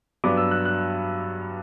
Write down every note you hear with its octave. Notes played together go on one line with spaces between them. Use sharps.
G2 F#3 B3 D4 D6
E6
F#6
F#6